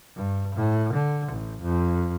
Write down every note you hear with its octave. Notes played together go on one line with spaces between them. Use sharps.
G2
A2
D3
A1
F2